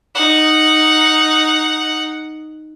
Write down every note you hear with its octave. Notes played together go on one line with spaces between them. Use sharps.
D#4 F#5